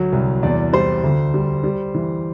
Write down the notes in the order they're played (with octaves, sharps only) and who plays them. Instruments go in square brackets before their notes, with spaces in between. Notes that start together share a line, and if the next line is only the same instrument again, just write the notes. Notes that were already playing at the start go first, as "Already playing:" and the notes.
Already playing: [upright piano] D2 F#3
C2
E2 D5
G3 C5
D2
G3
G3
E3